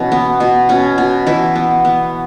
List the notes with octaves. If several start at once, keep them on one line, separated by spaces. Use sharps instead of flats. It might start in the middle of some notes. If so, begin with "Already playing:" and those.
Already playing: B2 E3 C#4 E4
B3
B2
B2 C#4
B2
B2 E3 E4
B3
B3